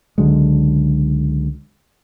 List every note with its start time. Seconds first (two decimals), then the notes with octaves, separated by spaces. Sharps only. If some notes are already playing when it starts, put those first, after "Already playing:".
0.18 C#2 D3 F#3 G#3